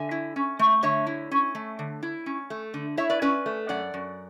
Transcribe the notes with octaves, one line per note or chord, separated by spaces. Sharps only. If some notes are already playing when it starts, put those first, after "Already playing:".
Already playing: D3 E5 G#5
E4
C#4
A3
D3 C#5 E5
E4
C#4
A3
D3
E4
C#4
A3
D3
E4 C#5 E5
B4 D5
C#4 B4 D5
A3
F#2 D5 F#5
F#2